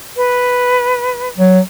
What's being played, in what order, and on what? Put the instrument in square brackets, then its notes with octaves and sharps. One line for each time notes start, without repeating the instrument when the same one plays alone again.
[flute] B4
[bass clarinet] F#3